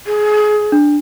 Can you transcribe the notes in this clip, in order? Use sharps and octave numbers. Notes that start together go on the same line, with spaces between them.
G#4
D4